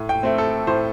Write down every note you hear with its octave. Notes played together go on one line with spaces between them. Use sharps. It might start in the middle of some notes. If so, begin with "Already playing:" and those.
Already playing: A2
G5
A3 C4
A4
A2 C5